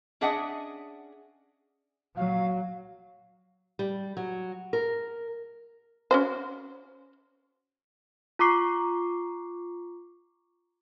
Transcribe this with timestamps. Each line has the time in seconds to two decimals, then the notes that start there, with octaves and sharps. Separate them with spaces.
0.21 C#4 D4 G#4 D#5 E5 F#5
2.16 A#2 F#3 F5
3.79 G3
4.17 F#3
4.73 A#4
6.11 C#4 F#4 C5
8.39 F4 A#5 C#6 D6 C7